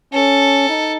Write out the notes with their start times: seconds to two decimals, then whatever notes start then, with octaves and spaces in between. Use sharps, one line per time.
0.13 C#4 A4
0.69 D#4